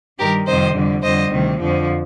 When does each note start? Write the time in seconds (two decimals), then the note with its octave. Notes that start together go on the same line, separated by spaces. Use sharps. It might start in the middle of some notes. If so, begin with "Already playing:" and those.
0.19 G2 D#3 G3 G4 A#4
0.47 F2 C3 D#3 G3 C5 D#5
0.75 F2 D3 G3
1.03 F2 D3 G3 C5 D#5
1.31 D2 C3 D#3
1.59 F2 D3 F3